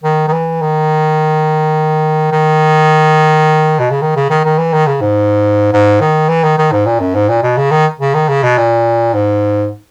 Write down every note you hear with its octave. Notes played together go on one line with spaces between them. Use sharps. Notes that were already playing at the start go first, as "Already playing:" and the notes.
D#3
D#3
E3
D#3
D#3
B2
C#3
D#3
C#3
D#3
D#3
E3
D#3
C#3
G#2
G#2
D#3
E3
D#3
D#3
G#2
A#2
F#2
G#2
A#2
B2
C#3
D#3
C#3
D#3
C#3
B2
A#2
G#2